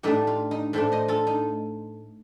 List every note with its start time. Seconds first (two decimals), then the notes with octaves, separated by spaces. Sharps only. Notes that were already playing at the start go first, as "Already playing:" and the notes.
0.03 A2 A3 D4 D#4 G4
0.27 F4
0.51 D#4
0.73 A2 A3 D4 A4 C5
0.92 C5 D#5
1.08 F4 A4
1.27 D#4